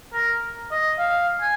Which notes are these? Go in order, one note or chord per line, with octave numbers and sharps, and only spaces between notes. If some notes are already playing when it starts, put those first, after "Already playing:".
A#4
D#5
F5
G#5